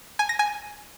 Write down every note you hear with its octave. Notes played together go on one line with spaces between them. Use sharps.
G#5
A#6
G#5